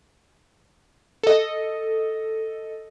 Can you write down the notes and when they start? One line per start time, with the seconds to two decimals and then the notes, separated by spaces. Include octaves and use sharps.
1.24 A4 D#5